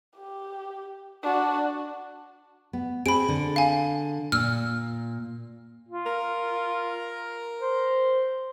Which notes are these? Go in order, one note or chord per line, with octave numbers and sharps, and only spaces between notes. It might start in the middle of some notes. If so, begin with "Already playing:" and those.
G4
D4 F#4
B3
C4 G#4 B5 D7
D3
F5 G#5
A#2 E6 F6
F4
A#4
C5